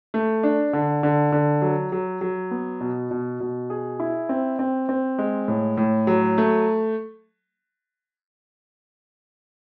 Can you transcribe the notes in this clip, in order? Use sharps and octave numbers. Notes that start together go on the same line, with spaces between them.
A3
D4
D3
D3
D3
F#3
F#3
F#3
B3
B2
B2
B2
G#4
E4
C4
C4
C4
G#3
A2
A2
F#3
A3